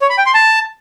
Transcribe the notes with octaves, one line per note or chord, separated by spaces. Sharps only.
C#5
B5
G5
C6
A5